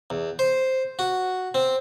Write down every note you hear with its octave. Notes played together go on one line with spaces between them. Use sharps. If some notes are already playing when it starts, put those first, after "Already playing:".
E2
C5
F#4
C4